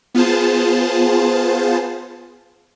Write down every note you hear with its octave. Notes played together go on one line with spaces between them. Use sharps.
B3 F4 G#4 C5 A5